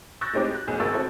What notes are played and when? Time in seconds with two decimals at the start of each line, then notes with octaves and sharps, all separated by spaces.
0.21 C#6 E6 F#6 G6 A6 A#6
0.33 A2 G#3 C4 D#4 G4 D6
0.54 F#6
0.67 F1 B1 G#4 G6
0.80 G#1 C#2 A#3 C#6 E6 A6
0.94 C4 E4 F#4 A4